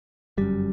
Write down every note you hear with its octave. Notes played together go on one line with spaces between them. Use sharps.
G1 F#2 G3